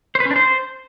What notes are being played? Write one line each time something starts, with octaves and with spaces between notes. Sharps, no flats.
C5
B4
C#4
D4
C5